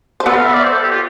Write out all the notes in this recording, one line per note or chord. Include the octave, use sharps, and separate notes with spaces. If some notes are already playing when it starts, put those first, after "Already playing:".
C5
B3 A4 B4
F5
E5
D5
C5
A4
G4
F4